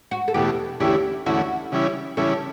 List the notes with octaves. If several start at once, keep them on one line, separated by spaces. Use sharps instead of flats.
F#4
A4
E2 B2 A3 G4
E2 D3 A3 C#4 E4 G4
E2 D3 A3 C#4 E4 F#4
C#3 E3 G3 C#4 E4
C#3 E3 G3 C#4 E4 A4